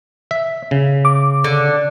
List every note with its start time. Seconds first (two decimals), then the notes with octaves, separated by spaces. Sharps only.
0.31 E5
0.71 C#3
1.05 D6
1.44 D3